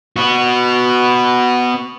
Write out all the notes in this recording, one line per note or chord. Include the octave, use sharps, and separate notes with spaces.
B3 F#4